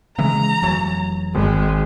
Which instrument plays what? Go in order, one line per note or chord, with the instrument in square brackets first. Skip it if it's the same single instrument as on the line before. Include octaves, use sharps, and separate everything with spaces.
[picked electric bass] C#3 E3 G#3 [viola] A#5
[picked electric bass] F1 E3 F#3
[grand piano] G#1 [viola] G#3